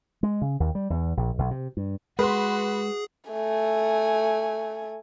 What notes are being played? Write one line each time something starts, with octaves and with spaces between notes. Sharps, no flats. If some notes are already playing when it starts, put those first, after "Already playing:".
G#3
C#3
D#2
G3
E2
A#1
B1
C3
G2
G#3 F#4 G#4 B4 C6
A3 G#5